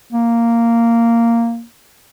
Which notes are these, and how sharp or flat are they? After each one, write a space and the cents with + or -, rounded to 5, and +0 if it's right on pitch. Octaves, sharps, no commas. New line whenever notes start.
A#3 -5